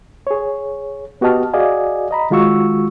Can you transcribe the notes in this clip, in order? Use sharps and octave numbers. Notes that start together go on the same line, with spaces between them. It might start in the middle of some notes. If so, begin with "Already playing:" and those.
G#4 C#5
B3 F#4 G4 D#5 A5 F6
F#4 G#4 D5 D#5 F5 G#5
D#5 A#5 B5
D#3 G#3 F4 F#4 C#6 E6